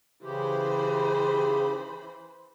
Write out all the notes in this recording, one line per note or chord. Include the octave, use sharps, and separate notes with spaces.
C#3 E3 G4 C5 B5